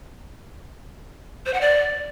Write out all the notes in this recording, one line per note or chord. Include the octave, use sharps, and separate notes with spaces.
C5
F#5
D5